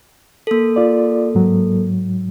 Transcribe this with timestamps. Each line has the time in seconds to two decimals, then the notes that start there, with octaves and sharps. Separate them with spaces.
0.47 A#3 A4
0.76 F4 D5
1.35 G#2 F#3